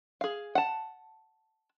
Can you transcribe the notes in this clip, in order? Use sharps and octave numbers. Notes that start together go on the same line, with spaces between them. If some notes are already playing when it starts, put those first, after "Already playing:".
G#4 F5
F#5 A5